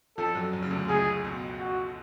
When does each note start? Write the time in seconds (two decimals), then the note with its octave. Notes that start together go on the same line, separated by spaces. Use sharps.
0.18 F2 F3 A4
0.35 F#2 F#3
0.53 F#2 F#3
0.62 C#3
0.71 D2 D3
0.88 C#2 C#3 G#4
1.25 B2
1.60 F#4